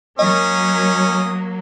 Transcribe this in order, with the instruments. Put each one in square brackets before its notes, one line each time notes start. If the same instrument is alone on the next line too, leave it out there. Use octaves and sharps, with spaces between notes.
[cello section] F#3 A#3 [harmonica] C#4 D#6 [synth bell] D#5